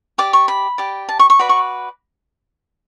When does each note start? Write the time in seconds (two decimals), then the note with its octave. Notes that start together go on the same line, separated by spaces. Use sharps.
0.18 G4 D5 D6
0.33 C#6
0.48 B5
0.78 G4 D5
1.09 A5
1.19 C#6
1.30 C#6
1.39 F#4 B4 D5 B5
1.49 C#6